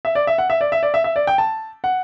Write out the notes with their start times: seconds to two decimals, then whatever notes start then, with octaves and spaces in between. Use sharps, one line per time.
0.05 E5
0.15 D5
0.27 E5
0.38 F#5
0.50 E5
0.61 D5
0.72 E5
0.83 D5
0.94 E5
1.04 E5
1.16 D5
1.27 G5
1.38 A5
1.84 F#5